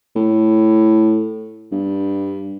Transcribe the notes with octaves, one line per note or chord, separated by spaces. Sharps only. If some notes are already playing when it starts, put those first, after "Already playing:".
A2
G2